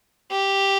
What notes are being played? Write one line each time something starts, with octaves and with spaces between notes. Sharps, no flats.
G4